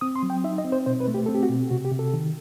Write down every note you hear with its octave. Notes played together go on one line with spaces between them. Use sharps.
C4 D#6
C6
F#3
G5
D#4 E5
D#5
C4
C5
B2 C5
B4
A3
G4
C4 A4
G4
F#4
B2
C3 F#4
G4
C3
A4
D#3